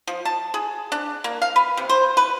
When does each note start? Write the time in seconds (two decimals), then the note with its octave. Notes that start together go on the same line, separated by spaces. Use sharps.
0.07 F3
0.25 A5
0.54 G#4
0.92 D4
1.24 A#3
1.42 F5
1.56 B4
1.77 C3
1.89 C5
2.17 B4